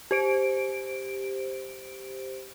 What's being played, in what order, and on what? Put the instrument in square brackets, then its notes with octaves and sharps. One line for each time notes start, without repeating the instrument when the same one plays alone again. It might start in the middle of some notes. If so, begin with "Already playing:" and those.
[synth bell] G4 C5 D7